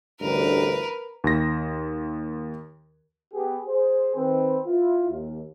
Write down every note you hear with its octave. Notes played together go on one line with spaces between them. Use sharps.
A1 D2 G2 A#4 B4
D#2 A#6
B3 G4 G#4
G#4 C5
D#3 C4 B4
E4 F4
D#2